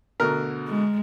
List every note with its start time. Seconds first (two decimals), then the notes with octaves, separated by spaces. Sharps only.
0.20 D2 B2 D3 A#4
0.68 G#3